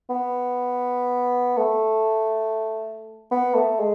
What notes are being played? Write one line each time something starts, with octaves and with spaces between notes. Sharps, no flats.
B3
A3
B3
A3
G#3